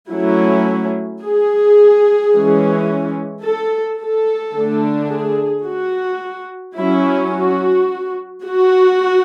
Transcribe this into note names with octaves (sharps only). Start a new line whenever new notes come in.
F#3 A3 C#4 E4
G#4
E3 G#3 C#4
A4
A4
D3 A3 D4
G#4
F#4
F#3 C#4 E4
F#4
F#4